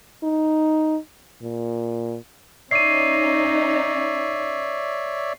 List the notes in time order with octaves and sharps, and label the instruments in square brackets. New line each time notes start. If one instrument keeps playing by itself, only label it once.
[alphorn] D#4
A#2
[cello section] C#4 D#4 [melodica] C#5 D5 E5 [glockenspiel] C7 D#7